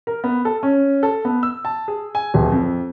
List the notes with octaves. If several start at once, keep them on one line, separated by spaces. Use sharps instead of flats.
A#4
B3
A4
C#4
A4
B3
E6
A5
G#4
G#5
D1
F2